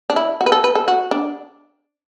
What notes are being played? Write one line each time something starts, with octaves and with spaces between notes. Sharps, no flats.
D4
E4
F#4
B4
A4
B4
A4
F#4
D4